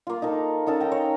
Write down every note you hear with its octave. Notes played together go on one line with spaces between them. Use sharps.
A#3 F4
D#4 A4 A#4
C#4 D#4 A4 A#4
G5 A#5
C#5